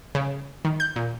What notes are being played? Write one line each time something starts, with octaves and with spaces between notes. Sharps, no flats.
C#3
D#3
G6
A#2